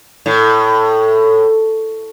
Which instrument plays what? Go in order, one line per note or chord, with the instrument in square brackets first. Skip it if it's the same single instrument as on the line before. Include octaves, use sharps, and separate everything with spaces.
[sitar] A2